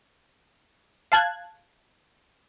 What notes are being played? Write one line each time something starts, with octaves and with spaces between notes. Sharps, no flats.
F5 A5 F#6 G#6